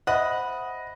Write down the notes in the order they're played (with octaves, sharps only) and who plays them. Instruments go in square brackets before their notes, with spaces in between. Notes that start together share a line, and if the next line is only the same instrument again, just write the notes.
[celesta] C5 E5 [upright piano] D#5 [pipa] F#5 [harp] B5 F#6